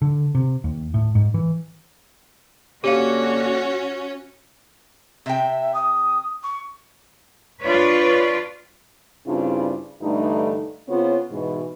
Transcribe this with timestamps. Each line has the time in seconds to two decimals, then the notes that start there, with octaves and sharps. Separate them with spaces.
0.02 D3
0.35 C3
0.64 D#2
0.94 A2
1.15 G#2
1.34 E3
2.84 D3 A#3 C#4 F#4 G4 F5
5.26 C3 E5 G5
5.74 D#6
6.43 C#6
7.62 D4 F4 B4 C#5 D5
9.27 G2 C#3 C4 D4 E4 F4
10.02 G2 D3 E3 A3 D#4
10.88 C#3 B3 C4 F4 C#5
11.31 G#2 B2 E3